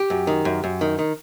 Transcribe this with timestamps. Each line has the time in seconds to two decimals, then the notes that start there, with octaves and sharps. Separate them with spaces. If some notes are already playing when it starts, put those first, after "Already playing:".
Already playing: G4
0.10 F#2
0.27 D#3
0.45 F#2
0.64 F#2
0.81 D#3
0.99 D#3